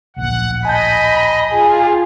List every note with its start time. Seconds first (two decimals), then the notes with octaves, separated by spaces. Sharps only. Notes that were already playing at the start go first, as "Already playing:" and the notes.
0.16 D1 A#1 F#5
0.65 D#5 G#5 A5 B5 G6
1.52 F4 G#4